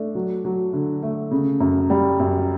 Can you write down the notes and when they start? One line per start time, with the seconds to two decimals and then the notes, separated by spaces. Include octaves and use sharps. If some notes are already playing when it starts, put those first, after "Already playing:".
Already playing: A3 D4
0.15 F#3
0.45 F#3
0.73 D3
1.03 A3
1.31 C#3
1.60 F#2
1.90 G3
2.20 F#2